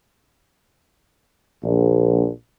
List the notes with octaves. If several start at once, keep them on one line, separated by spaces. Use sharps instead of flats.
A#1